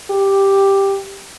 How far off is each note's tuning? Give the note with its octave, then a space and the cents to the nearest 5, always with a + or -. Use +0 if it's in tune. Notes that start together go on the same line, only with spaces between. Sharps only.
G4 +5